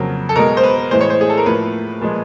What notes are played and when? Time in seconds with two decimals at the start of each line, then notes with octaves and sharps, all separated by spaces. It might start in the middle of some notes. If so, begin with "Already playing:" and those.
Already playing: F2 C#3 F#3 A#3
0.29 A4
0.36 B2 G#3 A#4
0.57 C5
0.63 B4
0.91 A2 E3 G#3 C5
1.01 C#5
1.10 C5
1.21 G#4
1.30 A4
1.37 A#4
1.46 A2 F3 A#3 B4
2.01 A#2 F3 G#3